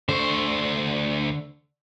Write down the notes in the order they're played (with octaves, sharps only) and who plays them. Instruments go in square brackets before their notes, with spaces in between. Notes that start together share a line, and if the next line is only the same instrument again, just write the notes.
[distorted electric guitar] D2 C5 [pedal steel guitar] D3 A4 C#6